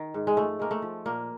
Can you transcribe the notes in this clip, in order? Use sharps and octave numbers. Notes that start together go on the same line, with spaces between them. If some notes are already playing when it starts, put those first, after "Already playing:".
Already playing: D#3
G#2
G#3
F3 A3
G#3 A#3
A3
F3
A#2 A#3